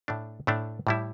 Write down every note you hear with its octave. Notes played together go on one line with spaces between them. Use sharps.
A2 A3 D4
A2 A3 D4
A2 G3 E4